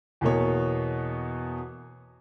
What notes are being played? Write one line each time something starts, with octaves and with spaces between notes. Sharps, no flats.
E2 B2 A#3 C#5